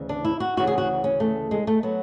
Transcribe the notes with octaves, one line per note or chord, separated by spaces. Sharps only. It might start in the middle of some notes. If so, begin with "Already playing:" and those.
Already playing: D2 C#3 E3
D4
E4
F#4
D2 C#3 E3 F#4
G#4
F#4
C#4
A3
G#3
A3
F#3 B3